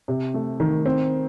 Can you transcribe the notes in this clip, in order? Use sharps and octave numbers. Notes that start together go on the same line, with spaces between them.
C3
A3
D#3
C4